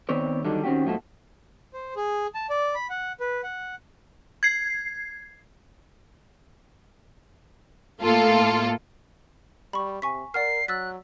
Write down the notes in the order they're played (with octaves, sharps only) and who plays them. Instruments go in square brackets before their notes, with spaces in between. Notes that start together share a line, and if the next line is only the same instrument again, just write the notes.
[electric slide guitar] D#3 B3 C4 C#5 D5
D3 D#3 F#3 G3 D4 D#4
D#3 C4 C#4 D#4 F#4 G4
G#2 F3 A3 A#3 F#4 A5
[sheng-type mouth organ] C5
G#4
A5
D5
B5
F#5
B4
F#5
[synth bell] G#6 C7
[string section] A2 A#3 F4 A4
[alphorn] G3 [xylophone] B5 C#6
[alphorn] C3 [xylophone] G#5 C#6 B6
[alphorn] A#4 [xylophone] D5 F#5 F6 [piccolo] C7
[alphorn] F#3 [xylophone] E6 A6 B6 [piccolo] F#6